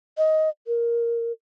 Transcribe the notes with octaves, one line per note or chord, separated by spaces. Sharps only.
D#5
A#4